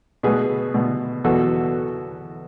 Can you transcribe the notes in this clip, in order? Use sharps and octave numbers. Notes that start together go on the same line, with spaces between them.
B2 A3 G#4 B4
B2 A3
E2 B2 F#3 B3 F#4 A4